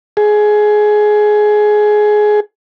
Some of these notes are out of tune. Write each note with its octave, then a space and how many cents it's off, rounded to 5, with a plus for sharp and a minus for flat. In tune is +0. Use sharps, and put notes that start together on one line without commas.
G#4 +15